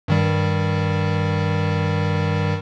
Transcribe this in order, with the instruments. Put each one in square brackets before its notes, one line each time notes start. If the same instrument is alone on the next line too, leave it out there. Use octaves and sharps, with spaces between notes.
[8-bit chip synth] G2 D#3 G3